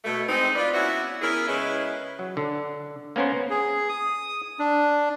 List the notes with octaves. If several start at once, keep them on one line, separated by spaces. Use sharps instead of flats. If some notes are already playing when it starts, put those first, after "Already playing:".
B2 A3
G#3 C4 D#4
F4 B4 D5
B3 C#4 E4 F#4 E5 F#5
B3 C#4 E4 G#4 A#4
C#3 G#3 C#4 E4 B4 D#5
F#3
D3
A#3 B3 C#4 A#4 C5
G#4
D#6
D4